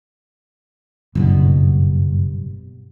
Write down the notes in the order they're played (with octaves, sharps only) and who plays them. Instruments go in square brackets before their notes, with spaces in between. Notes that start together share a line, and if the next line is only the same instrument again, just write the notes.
[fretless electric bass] F#1 [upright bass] G2 B2